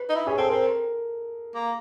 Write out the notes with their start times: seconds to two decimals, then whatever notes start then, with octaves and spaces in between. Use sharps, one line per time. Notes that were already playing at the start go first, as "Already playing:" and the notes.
Already playing: B4
0.09 D#4
0.15 E4
0.27 C#4 G#4
0.38 C4 A4
0.50 C4 A#4
1.55 A#3